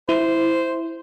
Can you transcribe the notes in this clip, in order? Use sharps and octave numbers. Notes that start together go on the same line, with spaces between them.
E4 C5